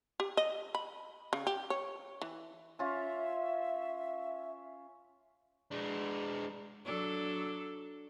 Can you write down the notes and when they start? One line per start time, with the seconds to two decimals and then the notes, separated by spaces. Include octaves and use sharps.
0.20 G4
0.37 D#5
0.75 B5
1.33 C#3
1.47 G4
1.70 C#5
2.21 E3
2.79 C#4 F4 E5
5.71 G#3 D4
6.86 F#3 D4 A4